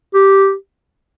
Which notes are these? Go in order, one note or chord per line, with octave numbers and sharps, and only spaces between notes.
G4